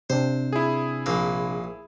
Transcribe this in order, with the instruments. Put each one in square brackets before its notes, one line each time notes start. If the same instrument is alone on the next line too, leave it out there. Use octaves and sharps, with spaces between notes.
[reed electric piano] C3 C4 D4 [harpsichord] C5
[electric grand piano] E4 G#4
[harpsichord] A#1 A#3